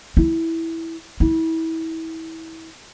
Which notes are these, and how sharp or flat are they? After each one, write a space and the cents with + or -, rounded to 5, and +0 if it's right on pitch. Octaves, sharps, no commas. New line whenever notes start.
E4 -5
E4 -30